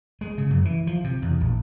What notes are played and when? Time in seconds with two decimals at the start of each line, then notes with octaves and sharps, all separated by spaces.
0.21 G#3
0.38 C#3
0.50 F#2
0.65 E3
0.87 F3
1.04 C3
1.22 E2
1.41 A#1